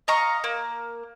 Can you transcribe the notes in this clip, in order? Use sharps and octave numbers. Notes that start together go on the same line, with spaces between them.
D#5 F5 A#5 C#6
A#3